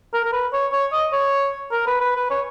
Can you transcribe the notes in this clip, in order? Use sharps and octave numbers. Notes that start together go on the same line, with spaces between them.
A#4
A#4
B4
C#5
C#5
D#5
C#5
A#4
B4
B4
B4
C#5